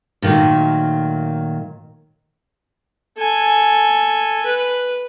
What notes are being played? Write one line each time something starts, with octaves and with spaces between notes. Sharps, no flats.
A#2 D3 D#3 F#3 A3
A4 G#5
B4